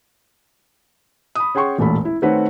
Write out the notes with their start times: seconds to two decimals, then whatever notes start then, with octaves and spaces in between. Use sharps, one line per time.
1.35 B5 D#6
1.55 C#4 G#4 F#5 G5 C6 C#6
1.78 E1 A1 A#2 A3 A4 B5
2.05 E4
2.22 D#3 A3 C4 F#4 B4 C#5